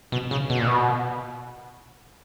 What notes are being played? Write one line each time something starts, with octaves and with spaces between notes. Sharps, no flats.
B2
C#3
B2
A#2
B2